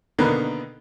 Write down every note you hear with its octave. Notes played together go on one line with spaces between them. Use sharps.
B2 D3 D#3 A#3 B3